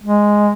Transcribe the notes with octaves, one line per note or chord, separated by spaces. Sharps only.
G#3